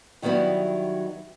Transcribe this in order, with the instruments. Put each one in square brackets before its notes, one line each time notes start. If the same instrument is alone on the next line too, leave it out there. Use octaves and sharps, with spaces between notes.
[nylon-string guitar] D#3 F#3 G3 B3 E4